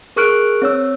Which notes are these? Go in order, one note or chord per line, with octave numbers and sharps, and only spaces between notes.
G#4 A#4 C#6 F6 F#6 D7
C4 C#5 E6